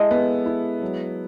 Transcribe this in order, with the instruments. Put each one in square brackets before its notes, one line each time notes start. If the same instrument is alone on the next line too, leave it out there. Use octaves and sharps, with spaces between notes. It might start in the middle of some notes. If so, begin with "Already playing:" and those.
Already playing: [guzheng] G#3 [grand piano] E4 A4
[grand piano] B3
E4
F#3